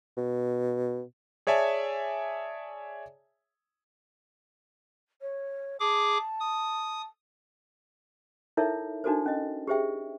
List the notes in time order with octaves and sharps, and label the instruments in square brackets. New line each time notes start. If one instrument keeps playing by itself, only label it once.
[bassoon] B2
[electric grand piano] G#4 C#5 D5 E5 G#5 A5
[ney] C#5
[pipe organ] G#4 D6 [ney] A5
[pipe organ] D#6
[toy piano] D#4 E4 A4 A#4 C#5 E5
D4 D#4 F#4 A4 A#4 C5
C#4 D#5
G4 G#4 C5 E5 G5